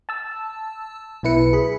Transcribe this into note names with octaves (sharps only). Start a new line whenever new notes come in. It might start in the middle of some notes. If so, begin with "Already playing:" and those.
A5 E6
B1 B2 E4 B4 C#7
G#4 B5